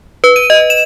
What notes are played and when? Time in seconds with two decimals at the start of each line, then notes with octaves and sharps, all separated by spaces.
0.24 B4
0.36 D#7
0.50 D#5
0.70 E7